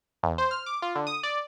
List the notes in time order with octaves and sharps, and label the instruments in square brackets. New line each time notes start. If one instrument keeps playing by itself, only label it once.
[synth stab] E2
C5
F6
D6
F4
D3
D#6
D5